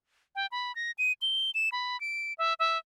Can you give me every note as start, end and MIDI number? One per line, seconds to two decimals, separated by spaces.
0.35 0.46 79
0.52 0.74 83
0.76 0.91 94
0.98 1.13 99
1.22 1.51 103
1.54 1.69 100
1.72 1.99 83
2.01 2.33 98
2.38 2.54 76
2.59 2.78 76